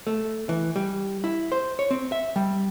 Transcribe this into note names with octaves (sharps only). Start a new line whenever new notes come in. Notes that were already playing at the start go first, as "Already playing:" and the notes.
A3
E3
G3
E4
C5
C#5
C4
E5
G3